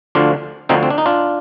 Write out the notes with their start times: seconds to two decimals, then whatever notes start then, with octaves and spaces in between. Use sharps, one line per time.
0.15 D2 D3 F3 D4 F4
0.69 D2 D3 F3 C4 D#4
0.83 C4
0.90 D4
0.98 D#4
1.06 D4 F4